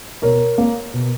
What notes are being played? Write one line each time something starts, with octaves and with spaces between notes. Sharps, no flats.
B2 A#4 C#5
A#3
B2